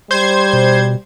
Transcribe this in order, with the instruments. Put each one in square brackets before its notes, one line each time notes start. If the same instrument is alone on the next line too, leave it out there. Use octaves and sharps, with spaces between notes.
[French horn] G3 [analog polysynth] C5 G#6
[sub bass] B2